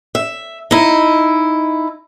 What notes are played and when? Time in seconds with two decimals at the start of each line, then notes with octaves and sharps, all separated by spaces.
0.15 E5
0.71 D#4 E4